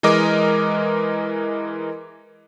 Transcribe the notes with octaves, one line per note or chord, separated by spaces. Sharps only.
E3 G#3 A#4 D#5 D6